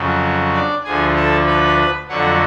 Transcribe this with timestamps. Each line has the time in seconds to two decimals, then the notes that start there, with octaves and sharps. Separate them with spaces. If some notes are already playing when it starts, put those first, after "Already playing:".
Already playing: F2 C#3 F#3
0.53 D4 D5
0.84 D2 D3 F3 G#4 G#5
1.16 A4 A5
1.46 B4 B5
2.08 F2 D3 F#3 F#4 F#5